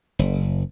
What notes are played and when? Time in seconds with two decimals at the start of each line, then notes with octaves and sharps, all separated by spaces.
0.19 F#1